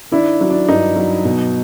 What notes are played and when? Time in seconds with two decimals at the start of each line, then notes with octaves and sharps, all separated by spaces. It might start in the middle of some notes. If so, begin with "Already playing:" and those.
0.11 D#3 D4 E4
0.41 F#3
0.50 D4
0.69 G2 D#4
0.96 F#3
1.25 B2